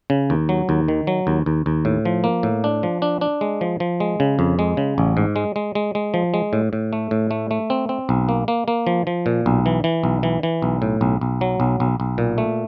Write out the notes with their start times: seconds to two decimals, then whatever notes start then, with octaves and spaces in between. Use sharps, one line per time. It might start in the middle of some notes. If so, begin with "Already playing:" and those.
0.10 C#3
0.30 D#2
0.49 F#3
0.69 D#2
0.88 D#3
1.07 F#3
1.27 D#2
1.46 D#2
1.66 D#2
1.85 A2
2.05 F3
2.24 A#3
2.43 A2
2.64 D4
2.83 F3
3.02 D4
3.21 D4
3.41 G#3
3.61 F3
3.80 F3
4.00 G#3
4.20 C#3
4.39 F2
4.59 G#3
4.77 C#3
4.98 A1
5.17 G#2
5.36 G#3
5.56 G#3
5.75 G#3
5.95 G#3
6.14 F3
6.34 G#3
6.53 A2
6.73 A2
6.93 A3
7.11 A2
7.31 A3
7.51 A3
7.70 C4
7.89 C4
8.09 B1
8.29 A#3
8.48 A#3
8.68 A#3
8.87 F3
9.07 F3
9.26 A#2
9.46 B1
9.66 E3
9.84 E3
10.04 B1
10.23 E3
10.43 E3
10.62 B1
10.82 A2
11.01 B1
11.21 B1
11.41 F#3
11.60 B1
11.80 B1
12.00 B1
12.18 A#2
12.38 A3